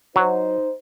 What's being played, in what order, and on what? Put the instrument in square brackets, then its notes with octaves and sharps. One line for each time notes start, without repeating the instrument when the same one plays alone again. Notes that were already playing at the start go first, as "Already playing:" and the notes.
[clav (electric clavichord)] F#3 [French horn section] D#4 C5